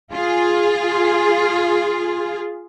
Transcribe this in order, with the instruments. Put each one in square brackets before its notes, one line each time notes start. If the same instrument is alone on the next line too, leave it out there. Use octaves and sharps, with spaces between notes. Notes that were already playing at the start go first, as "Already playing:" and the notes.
[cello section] F4 G#4